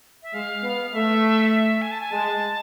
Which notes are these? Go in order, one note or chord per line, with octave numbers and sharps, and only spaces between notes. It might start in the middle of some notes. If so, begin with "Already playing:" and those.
E5
G#3 F5
B3
A3 E5
E5
G#5
A5
G#5
G#3 A5